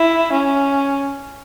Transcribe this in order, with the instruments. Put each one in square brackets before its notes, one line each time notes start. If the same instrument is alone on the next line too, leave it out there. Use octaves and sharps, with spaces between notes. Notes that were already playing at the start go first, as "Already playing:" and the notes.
Already playing: [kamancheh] E4
C#4